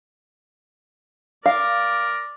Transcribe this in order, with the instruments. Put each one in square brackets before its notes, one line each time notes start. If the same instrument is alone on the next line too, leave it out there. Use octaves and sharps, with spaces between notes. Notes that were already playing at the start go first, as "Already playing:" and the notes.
[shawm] A#4 [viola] D5 [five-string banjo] F5